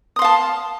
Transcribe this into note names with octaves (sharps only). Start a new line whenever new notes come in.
F5 A5 C6 D#6